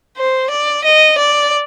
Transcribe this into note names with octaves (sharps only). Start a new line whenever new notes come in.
C5
D5
D#5
D5